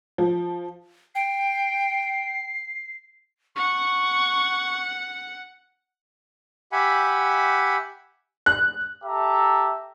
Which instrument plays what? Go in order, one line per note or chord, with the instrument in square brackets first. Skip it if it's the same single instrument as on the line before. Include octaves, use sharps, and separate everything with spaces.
[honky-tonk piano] F3
[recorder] G5 [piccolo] C7
[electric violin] F#5 [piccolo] C#6
[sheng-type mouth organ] G4 E5 F#5 G#5 B5
[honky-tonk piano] F#6
[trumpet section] G4 A4 E5 A#5